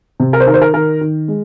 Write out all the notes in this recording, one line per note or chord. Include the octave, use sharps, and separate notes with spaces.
C3
A#4
C5
D#3 A#4
C5
A#4
D#3 A#4
D#3
G#3